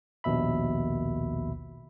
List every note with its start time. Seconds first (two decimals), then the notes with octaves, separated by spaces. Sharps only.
0.24 A#1 D#2 B2 E5 B5